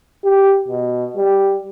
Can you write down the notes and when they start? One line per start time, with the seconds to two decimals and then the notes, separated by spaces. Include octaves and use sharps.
0.24 G4
0.68 B2
1.17 G3